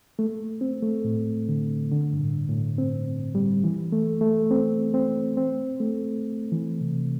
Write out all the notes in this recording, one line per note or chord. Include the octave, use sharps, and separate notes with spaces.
A3
C4
A3
A2
D3
D3
G2
A2
A2
C4
G3
E3
A3
A3
C4
C4
C4
A3
E3
C3